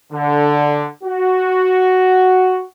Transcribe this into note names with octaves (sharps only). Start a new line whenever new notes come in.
D3
F#4